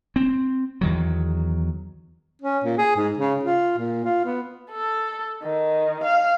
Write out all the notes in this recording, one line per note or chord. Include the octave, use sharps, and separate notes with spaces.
C4
E2 D#3 F#3
C#4
A#2
G#4
G#2
C#3
F4
A#2
F4
B3
A4
D#3
F5